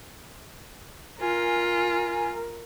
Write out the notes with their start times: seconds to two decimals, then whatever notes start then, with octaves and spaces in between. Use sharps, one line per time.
1.21 F4 A#4 G#5